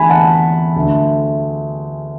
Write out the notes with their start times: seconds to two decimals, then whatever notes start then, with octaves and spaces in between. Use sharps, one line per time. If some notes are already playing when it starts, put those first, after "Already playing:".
Already playing: E2 D3 A3 G#5 B5
0.09 F#5 A5
0.76 D2 D3 A3